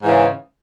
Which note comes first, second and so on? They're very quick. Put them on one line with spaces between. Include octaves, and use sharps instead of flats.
G#2 E3 C#3